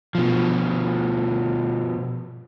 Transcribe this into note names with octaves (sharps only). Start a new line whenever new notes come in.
B2 F3